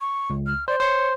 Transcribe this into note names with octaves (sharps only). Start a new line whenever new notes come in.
C#6
C#2
F6
C5 D5
C5 C#5 C6